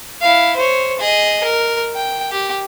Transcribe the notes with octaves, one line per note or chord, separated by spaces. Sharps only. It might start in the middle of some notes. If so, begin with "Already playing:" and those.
E4 F5
C5 C#5
G#4 D#5
A#4
G5
G4